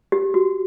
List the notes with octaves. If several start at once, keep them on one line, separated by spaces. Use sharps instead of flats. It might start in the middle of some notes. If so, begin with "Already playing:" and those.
G4
F#4